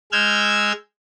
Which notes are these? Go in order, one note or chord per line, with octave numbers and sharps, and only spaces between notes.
G#3 E6 F6 G6 G#6